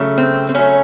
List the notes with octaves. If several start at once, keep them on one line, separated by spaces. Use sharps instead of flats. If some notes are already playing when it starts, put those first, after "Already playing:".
Already playing: C#3 F#3 A3
C4
C4
C#3 F#3 A3 C#4